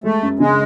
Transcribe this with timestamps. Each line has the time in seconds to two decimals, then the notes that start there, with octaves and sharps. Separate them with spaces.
0.04 G#3 A3
0.23 F#2
0.39 C#3 G#3